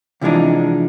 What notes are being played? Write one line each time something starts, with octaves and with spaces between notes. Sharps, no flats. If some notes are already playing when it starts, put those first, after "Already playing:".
C3 E3 F3 G#3 D4 D#4